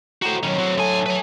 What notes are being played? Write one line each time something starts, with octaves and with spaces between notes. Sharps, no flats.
A2 F#4 C5 G5 A#5
D#3 F#3 C#4 B5
C4 F#4
D3 A3 G#4 G#5
F#3 B4 G#5